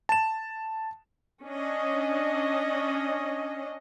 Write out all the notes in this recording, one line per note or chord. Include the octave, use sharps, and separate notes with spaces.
A5 E7
C#4 D4 D#5